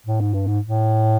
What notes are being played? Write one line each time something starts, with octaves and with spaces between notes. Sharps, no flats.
A2
G#2
G2
G#2
A2